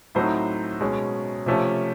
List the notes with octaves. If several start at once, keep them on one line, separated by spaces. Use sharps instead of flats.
A2 F#3 A3 C4 D#4 C5
B2 G#3 C#4
C3 F3 A3 C#4